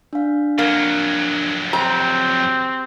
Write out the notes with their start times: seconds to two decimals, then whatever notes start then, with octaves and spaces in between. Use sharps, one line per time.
0.13 D4 F5
0.59 F2 F#3 A#3
1.73 C4 G4 A#5